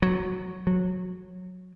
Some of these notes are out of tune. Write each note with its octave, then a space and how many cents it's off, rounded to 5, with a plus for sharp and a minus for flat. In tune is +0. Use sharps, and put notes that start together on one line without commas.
F#3 -10
F#3 -15